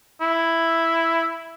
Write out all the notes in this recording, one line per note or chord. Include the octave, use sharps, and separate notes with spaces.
E4